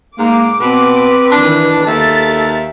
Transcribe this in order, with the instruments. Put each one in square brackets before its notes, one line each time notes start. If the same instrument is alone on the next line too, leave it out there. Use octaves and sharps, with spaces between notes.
[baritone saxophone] G#2 [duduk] A#3 [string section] D6
[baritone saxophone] B2 [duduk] C4 [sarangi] B4
[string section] D#3 E3 [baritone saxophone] D4
[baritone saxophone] D#2 [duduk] A4 [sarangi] E5 [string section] A6